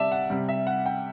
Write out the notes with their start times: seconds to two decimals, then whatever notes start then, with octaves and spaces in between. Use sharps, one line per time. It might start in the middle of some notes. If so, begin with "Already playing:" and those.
Already playing: C3 G3 D5 E5 A5
0.12 F#5
0.30 C3 G3
0.49 E5
0.67 F#5
0.86 G5